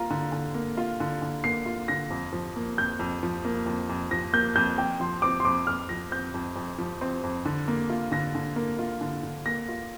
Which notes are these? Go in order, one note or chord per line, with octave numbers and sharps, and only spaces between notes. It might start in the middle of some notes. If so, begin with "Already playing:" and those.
Already playing: A#3 F4 A#5
D3
D3
A#3
F4
D3
D3
A#3 C7
F4
D3 A#6
F2
F3
A#3
F2 G6
F2
F3
A#3
F2
F2
F3 A#6
A#3 G6
F2 G6
F2 G5
F3 C6
C4 D6
C6
F2 D6
F2 F6
F3 A#6
C4 G6
F2
F2
F3
C4
F2
D3
A#3
F4
D3 A#6
D3
A#3
F4
D3
D3
A#3 A#6
F4